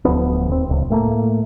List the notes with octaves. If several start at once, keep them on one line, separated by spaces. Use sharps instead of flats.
D1 D2 F3 B3
D#2 C4
D1 C#2
A2 A3 A#3